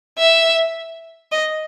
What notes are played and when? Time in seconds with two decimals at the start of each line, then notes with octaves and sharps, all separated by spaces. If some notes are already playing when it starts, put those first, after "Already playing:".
0.18 E5
1.31 D#5